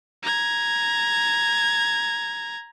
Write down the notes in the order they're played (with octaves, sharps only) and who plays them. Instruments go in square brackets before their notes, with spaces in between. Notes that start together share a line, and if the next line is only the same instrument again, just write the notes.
[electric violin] A#5 G#6